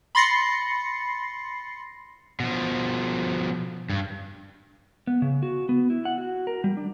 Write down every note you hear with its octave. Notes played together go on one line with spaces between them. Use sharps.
B5 C6 A6 A#6 C7 C#7
B2 F3
G2
B3
C#3
F#4
B3
E4
F#5
F#4
A#4
G3
D4